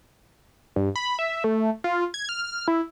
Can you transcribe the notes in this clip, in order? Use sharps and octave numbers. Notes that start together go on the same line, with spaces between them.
G2
B5
E5
A3
F4
G#6
F6
E4